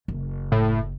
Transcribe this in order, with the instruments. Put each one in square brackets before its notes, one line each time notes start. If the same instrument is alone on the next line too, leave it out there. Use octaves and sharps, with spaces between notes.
[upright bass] F#1
[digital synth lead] A2